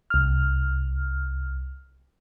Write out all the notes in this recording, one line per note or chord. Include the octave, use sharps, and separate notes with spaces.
C2 F6